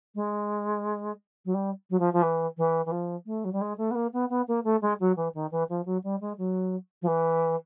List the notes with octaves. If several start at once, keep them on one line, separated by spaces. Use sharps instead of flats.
G#3
F#3
G3
F#3
F3
F3
E3
E3
E3
F3
A3
F#3
G3
G#3
A3
B3
A#3
B3
B3
A#3
A3
G#3
F#3
E3
D#3
E3
F3
F#3
G3
G#3
F#3
F3
E3